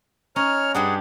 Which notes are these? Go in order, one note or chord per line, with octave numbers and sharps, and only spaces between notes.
C#4 D#4 C#5 A#5 F6
G2 G3 D4 G#4 F#5